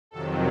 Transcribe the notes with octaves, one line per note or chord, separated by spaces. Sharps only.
F2 C3 D#3 F#3 A4